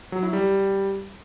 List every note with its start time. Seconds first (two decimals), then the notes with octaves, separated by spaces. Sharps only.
0.12 F#3
0.23 E4
0.33 G3